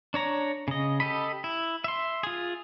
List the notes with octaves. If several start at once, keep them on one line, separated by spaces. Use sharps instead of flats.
D4 C#5 A#5
C#3 D#5
G4 A4 D#5 B5
E4
E5 C6
F4 G#4